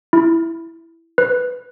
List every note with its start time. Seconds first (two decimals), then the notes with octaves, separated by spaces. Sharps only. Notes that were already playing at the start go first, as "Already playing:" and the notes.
0.13 E4
1.18 B4